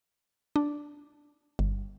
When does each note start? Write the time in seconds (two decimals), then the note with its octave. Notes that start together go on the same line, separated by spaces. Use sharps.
0.56 D4
1.59 G1